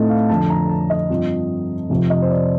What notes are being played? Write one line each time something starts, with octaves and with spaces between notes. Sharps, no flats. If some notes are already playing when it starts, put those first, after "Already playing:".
Already playing: A2 A3 C4 D#4 A4 D#5
F5
F2 D3 F3 A5
A#5
A5
D#5
G2 F3 C4
F2 C3 F3
D#5
C5
D5